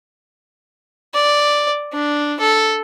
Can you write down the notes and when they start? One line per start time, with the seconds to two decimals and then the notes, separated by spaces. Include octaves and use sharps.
1.14 D5
1.93 D4
2.40 A4